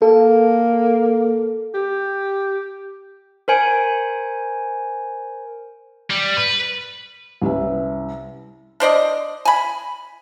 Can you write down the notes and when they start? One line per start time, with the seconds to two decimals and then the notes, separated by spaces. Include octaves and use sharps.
0.02 A#3 A4
1.74 G4
3.48 A#4 C5 G#5 D7
6.10 G3
6.37 B4
7.42 C2 C#4 B4 E5
8.80 D4 C5 D5 D#5
9.45 G#5 B5